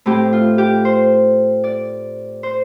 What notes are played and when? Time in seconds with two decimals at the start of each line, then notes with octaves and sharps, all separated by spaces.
0.06 A2 A3 C4 G4
0.33 F4
0.58 G4
0.85 C5
1.64 D5
2.43 C5